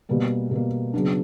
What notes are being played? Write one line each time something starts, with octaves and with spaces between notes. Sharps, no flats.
B2 G3 A#3
B2 G3 A#3
C#3 F#3 B3 D4